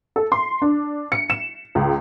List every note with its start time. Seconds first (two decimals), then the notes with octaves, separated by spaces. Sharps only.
0.16 A4
0.32 C6
0.62 D4
1.12 C#7
1.30 E7
1.75 C#2